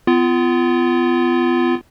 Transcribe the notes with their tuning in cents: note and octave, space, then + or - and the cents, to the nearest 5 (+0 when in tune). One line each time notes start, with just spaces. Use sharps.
B3 +35 F4 -25